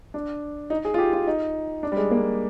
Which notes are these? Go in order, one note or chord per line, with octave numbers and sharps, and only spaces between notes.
D4
D#4
G#4
F4
G4
F4
D#4
D4
G3
G#3
A#3